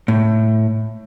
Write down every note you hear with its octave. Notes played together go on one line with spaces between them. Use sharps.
A2